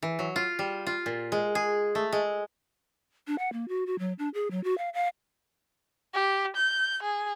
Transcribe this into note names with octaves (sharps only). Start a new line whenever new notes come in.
E3
F#3
F4
G3
F4
A#2
G#3
G#4
A3
G#3
D4
F#5
A#3
F#4
F#4
F#3
D4
G#4
F#3
F#4
F5
F5
G4
G6
G#4